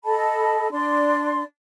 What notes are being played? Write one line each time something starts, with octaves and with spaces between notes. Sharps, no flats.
A4 D#5 A5 B5
D4 D5 C6